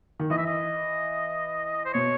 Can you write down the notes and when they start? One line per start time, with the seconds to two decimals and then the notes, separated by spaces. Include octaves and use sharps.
0.19 D#3
0.30 E3 D#5
0.38 E5
0.46 D#5
1.85 C5
1.94 B2 C#5